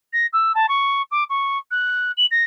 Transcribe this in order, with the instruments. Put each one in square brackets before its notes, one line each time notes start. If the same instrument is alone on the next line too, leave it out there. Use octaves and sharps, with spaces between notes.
[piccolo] A#6
E6
A5
C#6
D6
C#6
F#6
F#7
A#6